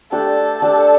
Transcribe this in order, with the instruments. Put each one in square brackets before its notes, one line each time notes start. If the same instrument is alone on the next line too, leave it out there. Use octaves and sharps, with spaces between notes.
[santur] A3 D4 G4 D5 [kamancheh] A4
[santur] A3 D4 G4 D5